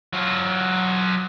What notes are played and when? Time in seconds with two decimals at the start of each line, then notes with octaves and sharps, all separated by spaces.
0.13 F#3 F4